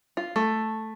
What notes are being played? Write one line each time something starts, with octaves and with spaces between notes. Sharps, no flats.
F4
A3